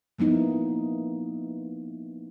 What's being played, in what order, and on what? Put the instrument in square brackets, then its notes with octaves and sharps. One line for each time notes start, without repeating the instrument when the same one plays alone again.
[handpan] F3 A#3 B3 D#4 E4